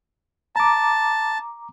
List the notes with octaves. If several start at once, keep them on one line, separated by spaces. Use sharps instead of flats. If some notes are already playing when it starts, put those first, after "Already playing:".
A5 A#5 D6